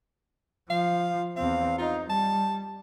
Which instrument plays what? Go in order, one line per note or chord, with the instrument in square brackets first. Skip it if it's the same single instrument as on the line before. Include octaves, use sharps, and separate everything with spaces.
[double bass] F3 [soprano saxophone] F5
[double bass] E2 C4 [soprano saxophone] F5
[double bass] D#4 [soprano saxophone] F4
[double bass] G3 [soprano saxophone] A5